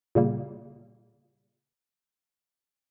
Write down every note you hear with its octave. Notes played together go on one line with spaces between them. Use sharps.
A#2 C#3 G3 A#3